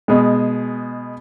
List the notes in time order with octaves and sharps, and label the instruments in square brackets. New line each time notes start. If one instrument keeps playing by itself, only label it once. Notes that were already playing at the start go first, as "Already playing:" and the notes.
[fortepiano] B2 G#3